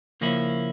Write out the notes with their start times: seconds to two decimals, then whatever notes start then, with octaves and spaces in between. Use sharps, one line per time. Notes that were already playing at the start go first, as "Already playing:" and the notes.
0.21 C#3 F3 A#3 C#4 E4